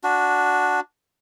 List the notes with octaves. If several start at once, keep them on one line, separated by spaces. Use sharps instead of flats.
D4 F#4